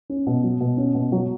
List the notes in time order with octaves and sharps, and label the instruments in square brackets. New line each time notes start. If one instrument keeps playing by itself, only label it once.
[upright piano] C#4
B2
F#3
B2
C#4
B2
F#3